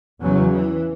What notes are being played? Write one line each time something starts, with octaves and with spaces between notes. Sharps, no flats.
E2 C#3 F#3
E3